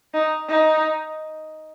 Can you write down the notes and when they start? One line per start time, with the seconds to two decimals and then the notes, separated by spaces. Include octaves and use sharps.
0.14 D#4
0.49 D#4